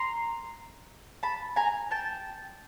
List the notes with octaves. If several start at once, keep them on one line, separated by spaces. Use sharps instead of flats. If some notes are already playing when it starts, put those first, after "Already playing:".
Already playing: A#5 C6
A5 B5
G#5 A#5
G5 A5